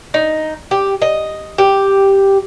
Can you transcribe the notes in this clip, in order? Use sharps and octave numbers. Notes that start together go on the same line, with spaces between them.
D#4
G4
D#5
G4